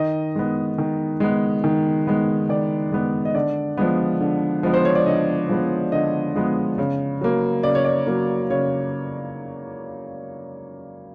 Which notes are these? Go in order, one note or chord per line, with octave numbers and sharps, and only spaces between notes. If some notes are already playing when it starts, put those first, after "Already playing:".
Already playing: D#3 D#5
G#3 B3
D#3
G#3 B3
D#3
G#3 B3
D#3 D5
G#3 B3
D#5
D3 D5
F3 G#3 B3
D3
F3 G#3 B3
C5
C#5
D5
D3 D#5
F3 G#3 B3
D3 D#5
F3 G#3 B3
C#3
F#3 A#3
C#3 D5
C#5
D5
F#3 A#3
C#3 C#5